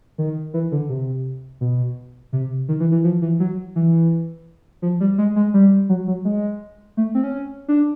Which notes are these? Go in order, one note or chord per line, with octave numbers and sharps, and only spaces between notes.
D#3
E3
D3
C3
B2
C3
D#3
E3
E3
F3
E3
F#3
E3
F3
G3
G#3
G#3
G3
F#3
F#3
G#3
A3
C4
C#4
D4